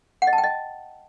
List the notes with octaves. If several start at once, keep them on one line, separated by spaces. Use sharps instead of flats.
F#5
D#5
A5
G5
D#5